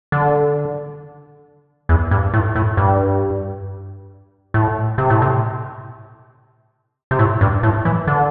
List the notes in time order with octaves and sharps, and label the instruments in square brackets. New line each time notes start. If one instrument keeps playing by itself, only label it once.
[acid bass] D3
E2
G2
A2
A2
G2
A2
C3
A2
C3
C3
A2
G2
A2
E3
D3